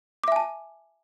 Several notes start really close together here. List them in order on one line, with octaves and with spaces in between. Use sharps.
D6 E5 G#5 A5